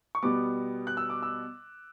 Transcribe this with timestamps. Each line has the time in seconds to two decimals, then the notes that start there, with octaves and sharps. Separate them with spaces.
0.15 C#6
0.23 B2 G3 B3 D6
0.87 F#6
0.97 E6
1.10 D6
1.23 E6